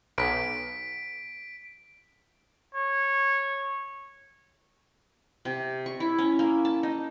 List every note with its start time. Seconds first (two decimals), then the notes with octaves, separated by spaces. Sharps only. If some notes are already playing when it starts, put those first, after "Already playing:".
0.18 B1 B6 D7
2.74 C#5
5.45 C3
5.86 C#6
6.00 E4
6.18 C#4
6.39 A#3
6.65 A5
6.83 D#4